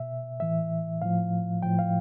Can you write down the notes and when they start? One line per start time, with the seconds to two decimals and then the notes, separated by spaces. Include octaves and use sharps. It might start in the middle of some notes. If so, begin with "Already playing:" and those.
Already playing: B2 E5
0.40 A2 E3 E5
1.02 A2 F3 F5
1.63 A2 F3 G5
1.79 F5